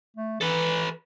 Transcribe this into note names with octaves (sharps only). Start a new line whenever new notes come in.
A3
E3 A4 B4